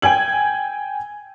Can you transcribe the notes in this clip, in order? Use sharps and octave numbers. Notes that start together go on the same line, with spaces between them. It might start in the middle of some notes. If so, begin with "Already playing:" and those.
G5 G#5 G#6 F#7